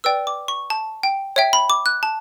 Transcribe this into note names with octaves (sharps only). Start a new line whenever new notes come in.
B4 D5 G5 E6
D6
C#6
A5
G5
C#5 E5 G5
B5
D6
F#6
A5